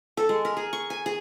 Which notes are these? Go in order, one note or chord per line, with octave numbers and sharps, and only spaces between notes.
A4
G#3
A#4
G#4
C#6
G#5
G#4